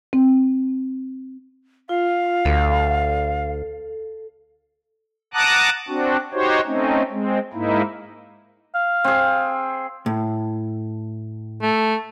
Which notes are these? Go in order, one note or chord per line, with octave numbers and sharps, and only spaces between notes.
C4
F4 F5
D2 A4
F#5 A5 A#5 D6 D#6 F#6
C4 D4 F#4
D#4 F#4 G4 C5 C#5
A3 C4 C#4 D#4
G#3 C4
G#2 A#3 D#4 E4
F5
C4 G#4
A2
A3